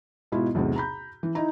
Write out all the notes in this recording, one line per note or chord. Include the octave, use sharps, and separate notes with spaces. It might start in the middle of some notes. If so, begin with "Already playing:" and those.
G#2 B2 E4 F4
B1 E2 A2 C3
A#5 B5 G6
E3
D#4 E4 A#5